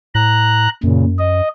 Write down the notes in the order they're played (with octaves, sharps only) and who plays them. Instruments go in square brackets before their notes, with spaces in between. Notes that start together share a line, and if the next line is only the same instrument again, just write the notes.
[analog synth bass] A2 [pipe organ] A#5 F#6
[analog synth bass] F#2 [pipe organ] A#2 C#3
[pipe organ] D#5